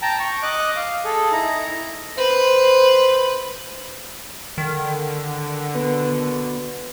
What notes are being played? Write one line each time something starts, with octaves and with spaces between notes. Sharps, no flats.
G5 A5 A#5
C#6
D#5 D6 F#6
F5
G#4 A4
D#4 E4 A#5
B4 C5
D3 D#3
B2 B4